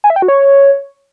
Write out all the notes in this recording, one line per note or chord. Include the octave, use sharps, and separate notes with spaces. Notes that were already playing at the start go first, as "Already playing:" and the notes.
G#5
E5
G5
F#4
C#5